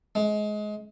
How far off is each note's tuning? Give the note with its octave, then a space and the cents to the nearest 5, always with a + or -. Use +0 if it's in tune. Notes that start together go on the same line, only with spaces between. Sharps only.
G#3 +25